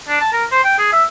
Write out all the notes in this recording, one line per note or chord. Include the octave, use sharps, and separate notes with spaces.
D4
A5
A#4
C5
G5
G#4
E5